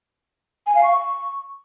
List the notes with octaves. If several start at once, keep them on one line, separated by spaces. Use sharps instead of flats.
G#5
F5
C#6